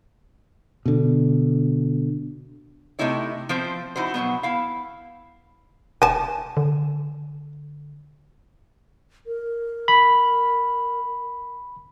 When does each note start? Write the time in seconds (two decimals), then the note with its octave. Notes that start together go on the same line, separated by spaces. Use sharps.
0.86 B2 D3
2.99 C3 F#3 A3 D#4 E4 C#5
3.49 F3 C4 C5
3.96 D#4 E4 F#4 C5
4.14 B2 F#3 A3 B3
4.43 E4 F5
6.02 E1 G#5 A5
6.57 D3
9.27 A#4
9.88 B5